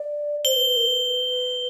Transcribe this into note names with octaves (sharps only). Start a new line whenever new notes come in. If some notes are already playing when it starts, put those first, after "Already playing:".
Already playing: D5
C5 G7
B4
B4
A#4
B4